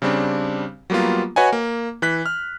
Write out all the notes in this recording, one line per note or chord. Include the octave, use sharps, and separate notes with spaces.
C#3 G3 C4 D4
F#3 G3 A#3 B3 F4
F#4 B4 C#5 D#5 F#5 G#5
A#3
E3 F#6 B6
F6